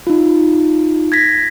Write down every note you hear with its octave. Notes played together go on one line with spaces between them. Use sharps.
D#4 F4
G#6 A#6 B6